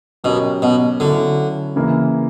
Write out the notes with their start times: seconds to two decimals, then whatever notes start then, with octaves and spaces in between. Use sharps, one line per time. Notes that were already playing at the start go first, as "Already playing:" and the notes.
0.24 B2 F#3 C#4 G4 A#4
0.62 B2
1.00 D3 F#3 C#4 E4
1.76 C#3 E3 A#3 E4 A#4